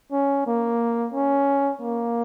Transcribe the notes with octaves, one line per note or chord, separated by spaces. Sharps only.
C#4
A#3
C#4
A#3